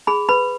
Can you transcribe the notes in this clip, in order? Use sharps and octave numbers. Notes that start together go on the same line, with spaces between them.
G#4 B5
B4 B5